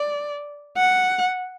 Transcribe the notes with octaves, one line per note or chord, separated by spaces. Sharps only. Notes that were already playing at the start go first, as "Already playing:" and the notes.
Already playing: D5
F#5